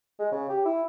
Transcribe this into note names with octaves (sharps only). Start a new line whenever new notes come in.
G#3
C#3
G4
E4